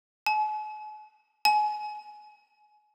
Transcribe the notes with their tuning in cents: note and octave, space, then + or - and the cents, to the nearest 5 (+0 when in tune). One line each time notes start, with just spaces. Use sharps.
G#5 +45
G#5 +25